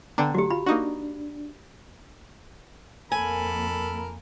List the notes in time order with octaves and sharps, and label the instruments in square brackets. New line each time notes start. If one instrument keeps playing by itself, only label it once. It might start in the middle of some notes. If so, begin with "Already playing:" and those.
[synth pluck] D3 D4 [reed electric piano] B3 G5 [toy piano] A#5
[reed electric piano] F#3 A3 [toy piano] F#4 G4
[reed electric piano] F4 [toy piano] B5
[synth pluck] A#3 D#4 F#4 [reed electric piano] D4
[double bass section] F2 A#3 [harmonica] A4 A#4 B5 [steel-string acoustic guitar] G#5